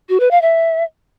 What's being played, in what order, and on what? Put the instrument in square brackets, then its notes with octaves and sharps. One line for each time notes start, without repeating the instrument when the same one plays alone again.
[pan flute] F#4
B4
F5
E5